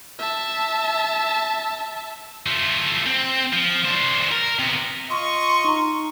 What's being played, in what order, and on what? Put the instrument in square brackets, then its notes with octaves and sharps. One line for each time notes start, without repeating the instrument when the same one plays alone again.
[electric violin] E5 A5
[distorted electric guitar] A3 F4
C4
F3
D4 C5
A#4
C3 B3
[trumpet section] F4 D#5 C#6 [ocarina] C6
[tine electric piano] D#4 A#5